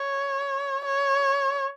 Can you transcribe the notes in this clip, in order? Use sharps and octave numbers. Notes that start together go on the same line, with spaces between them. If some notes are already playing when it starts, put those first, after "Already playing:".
Already playing: C#5
C#5